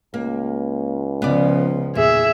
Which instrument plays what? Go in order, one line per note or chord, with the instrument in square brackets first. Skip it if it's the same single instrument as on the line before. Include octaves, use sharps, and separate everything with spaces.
[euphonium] C#2 [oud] A#3
[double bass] C#3 F3 [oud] B3 D5
[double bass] E2 [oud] A#2 [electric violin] G#4 E5